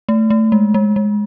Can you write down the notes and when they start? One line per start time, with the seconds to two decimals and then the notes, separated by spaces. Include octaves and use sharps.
0.09 A3
0.30 A3
0.52 G#3
0.74 G#3
0.96 G#3